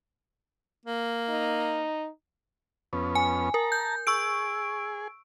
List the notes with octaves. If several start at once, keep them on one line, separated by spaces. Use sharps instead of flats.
A#3
D#4
F2 B3 C#4
G#5
A#4 A5 A#5
G6
G#4 C#6 E6 D7